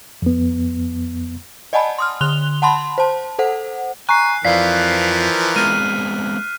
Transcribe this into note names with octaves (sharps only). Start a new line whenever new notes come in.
F2 B3
D5 D#5 F#5 G#5 A5 B5
C6 D#6 F6
D3 C6 F#6 F7 G7
F#5 A5 B5 C6
C5 A5
A4 C5 F#5
G#5 A#5 C#6 F#6 C7
F2 E3 F3 A#4 D5 F5 B6 C7
G#3 B3 C4 F6 D#7